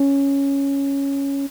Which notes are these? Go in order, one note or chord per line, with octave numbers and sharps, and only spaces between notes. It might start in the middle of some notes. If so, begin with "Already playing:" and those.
Already playing: C#4